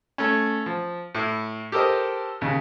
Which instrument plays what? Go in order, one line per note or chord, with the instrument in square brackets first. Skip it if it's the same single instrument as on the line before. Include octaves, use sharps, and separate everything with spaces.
[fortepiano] A3 C#4
F3
A2 E4
G4 A4 A#4 C5 D#5
D#2 C#3